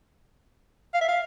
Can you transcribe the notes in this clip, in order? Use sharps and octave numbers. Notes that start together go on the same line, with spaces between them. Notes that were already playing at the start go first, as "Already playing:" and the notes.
F5
E5
F5